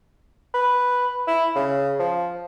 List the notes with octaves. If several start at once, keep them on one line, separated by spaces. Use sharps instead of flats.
B4
E4
C#3
F3